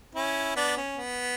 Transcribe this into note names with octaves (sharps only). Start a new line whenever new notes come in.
C#4 E4
B3 D4
C#4
B3